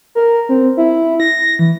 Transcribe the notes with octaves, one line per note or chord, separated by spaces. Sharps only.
A#4
C4
E4
A#6
E3